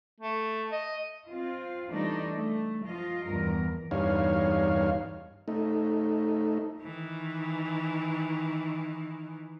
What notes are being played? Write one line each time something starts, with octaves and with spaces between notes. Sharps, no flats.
A3
D#5
C4 F4
E3 G3 A3 D4 D#4
A3
F3 F4 D#5
E2 G2 A#4
E2 G2 D#4 C#5 F5
A3 D#4
D#3 E3